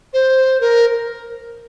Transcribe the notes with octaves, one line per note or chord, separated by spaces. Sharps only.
C5
A#4